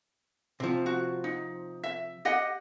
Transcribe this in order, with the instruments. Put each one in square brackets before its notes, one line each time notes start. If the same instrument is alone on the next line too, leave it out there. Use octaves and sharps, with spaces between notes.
[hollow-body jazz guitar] C3 F3
[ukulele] F#4
D#4
E5
G4 D#5 F#5